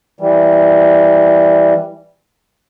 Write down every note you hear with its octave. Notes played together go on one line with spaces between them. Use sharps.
E3 G3